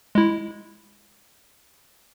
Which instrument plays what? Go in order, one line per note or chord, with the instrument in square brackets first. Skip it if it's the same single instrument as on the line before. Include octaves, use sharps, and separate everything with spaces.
[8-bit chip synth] G#3 E4